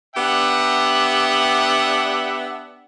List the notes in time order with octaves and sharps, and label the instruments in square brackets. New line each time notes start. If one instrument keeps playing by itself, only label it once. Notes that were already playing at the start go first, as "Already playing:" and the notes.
[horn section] B3 D4 G4 E5 F#5